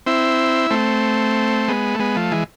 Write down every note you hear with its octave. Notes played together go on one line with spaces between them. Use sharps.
C4 E4
A3 C4
G#3 B3
A3
G#3 B3
F3 A3
E3 G#3